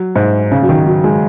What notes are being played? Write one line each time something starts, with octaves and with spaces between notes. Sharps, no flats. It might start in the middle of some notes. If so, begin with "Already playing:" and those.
Already playing: F#3
G#2
C#3
F#3
D#3
F#3
G#3